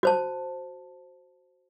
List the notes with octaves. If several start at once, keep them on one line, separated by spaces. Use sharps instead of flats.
F#4 C5 A5